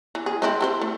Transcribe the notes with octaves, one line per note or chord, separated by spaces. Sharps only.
E3
G#4
G#3 C4 E4
E4 A4 C5
A3